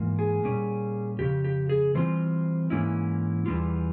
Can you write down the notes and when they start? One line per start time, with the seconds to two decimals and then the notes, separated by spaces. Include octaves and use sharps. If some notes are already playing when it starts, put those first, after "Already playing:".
Already playing: G#2 E3 A#3
0.19 G#4
0.44 A#2 G3 C#4
1.19 F2 C#3 G4
1.44 G4
1.69 G#4
1.95 E3 G3 C4 F4 C5
2.70 G#2 E3 A#3 C#4 E4
3.46 E2 E3 G3 C#4 F4